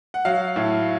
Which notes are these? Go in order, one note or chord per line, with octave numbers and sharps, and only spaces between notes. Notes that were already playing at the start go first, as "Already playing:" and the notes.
F#5
F#3 F5
A2